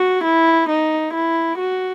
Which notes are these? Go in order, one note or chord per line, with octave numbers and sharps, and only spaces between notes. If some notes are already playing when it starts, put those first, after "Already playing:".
Already playing: F#4
E4
D#4
E4
F#4